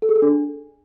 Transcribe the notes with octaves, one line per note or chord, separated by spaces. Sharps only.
A4
G#4
A4
D4